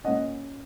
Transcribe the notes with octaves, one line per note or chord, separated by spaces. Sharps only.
A#2 A#3 C#4 D#5 F#5